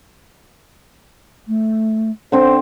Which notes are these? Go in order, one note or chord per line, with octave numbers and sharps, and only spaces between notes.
A3
D3 C4 D4 C5